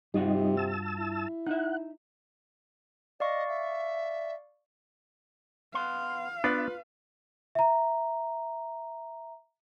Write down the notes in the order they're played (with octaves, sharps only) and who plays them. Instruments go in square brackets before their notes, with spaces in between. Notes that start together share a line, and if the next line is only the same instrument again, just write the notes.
[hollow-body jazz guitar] G2 F4 F#4 [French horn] C3 [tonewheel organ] G3 D#4
[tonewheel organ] A5 E6
[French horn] E4
[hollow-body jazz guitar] D#4 E5 [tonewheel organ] F#5
[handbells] D5 F5 C#6 [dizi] D#5
[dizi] E5
[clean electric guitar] B3 C6 [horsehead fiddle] F5
[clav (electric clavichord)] B3 D4 [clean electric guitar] F4 [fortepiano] B4
[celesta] E5 A#5